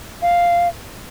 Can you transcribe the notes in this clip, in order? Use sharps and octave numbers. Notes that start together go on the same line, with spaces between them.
F5